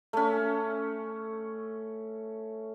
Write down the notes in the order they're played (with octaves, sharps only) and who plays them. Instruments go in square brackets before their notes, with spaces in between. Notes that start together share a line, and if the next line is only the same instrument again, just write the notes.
[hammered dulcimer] A3 C#4